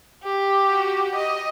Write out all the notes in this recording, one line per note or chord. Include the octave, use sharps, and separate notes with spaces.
G4
F#4
D#5